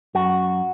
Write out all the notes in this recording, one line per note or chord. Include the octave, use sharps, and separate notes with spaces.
F#2 F#4